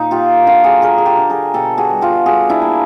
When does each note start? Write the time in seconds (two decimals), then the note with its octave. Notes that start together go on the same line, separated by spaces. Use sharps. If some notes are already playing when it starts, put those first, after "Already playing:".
Already playing: A#2 D#4
0.11 A#3 F4 G4
0.46 D3 F4 G4
0.64 F#4 G#4
0.82 A#3 G#4 A#4
0.98 G#4
1.06 G4 A4
1.18 D3
1.30 G#4 A#4
1.54 B2 G4 A4
1.78 F#4 G#4
1.90 G3
2.01 F4 G4
2.26 G3 F#4 G#4
2.49 D4 E4
2.62 A#3